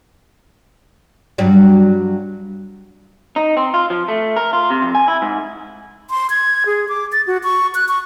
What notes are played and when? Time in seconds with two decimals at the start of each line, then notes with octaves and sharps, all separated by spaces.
1.38 G2 F#3 G3
3.36 D#4
3.57 C4
3.74 F4
3.90 F3
4.08 A3
4.36 A#4
4.53 F4
4.70 C3
4.82 F2
4.95 G#5
5.08 E4
5.22 G#2
6.10 C6
6.30 G#6
6.66 G#4
6.89 D6
7.12 A6
7.27 F#4
7.44 C#6
7.75 F#6
7.89 C#6